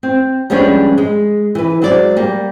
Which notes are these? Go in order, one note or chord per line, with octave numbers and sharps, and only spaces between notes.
C4
F3 G3 G#3 B3 C#4 D4
G#3
E3 B4
F#3 G#3 C5 D5
G3 A#3